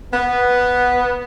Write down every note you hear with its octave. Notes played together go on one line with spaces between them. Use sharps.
B3